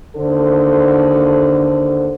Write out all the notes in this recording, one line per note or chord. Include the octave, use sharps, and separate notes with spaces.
D#2 D3 A4 C5